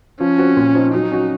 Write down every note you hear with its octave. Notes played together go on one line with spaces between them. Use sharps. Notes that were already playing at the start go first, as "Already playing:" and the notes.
F3 C#4
C4 F#4
A#2
F3 C4 D#4
F#3 D#4
C#4 F#4